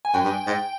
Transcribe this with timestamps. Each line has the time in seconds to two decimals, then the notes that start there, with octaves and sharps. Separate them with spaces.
0.05 G#5
0.14 F#2 G5
0.24 G2
0.47 G#2